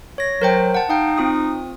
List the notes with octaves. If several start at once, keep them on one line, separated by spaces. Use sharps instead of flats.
C#5 A#6
F#3 A#4 C5 G5
F#5 A5
D#4 F5 G5
C4 F4 D#6